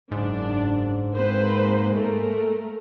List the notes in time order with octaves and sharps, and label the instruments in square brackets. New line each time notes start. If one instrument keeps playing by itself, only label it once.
[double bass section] F#1 [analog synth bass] G#2 [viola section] D4
[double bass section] G#3 A#3 [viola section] C4 B4 C5
[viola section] A3 A#4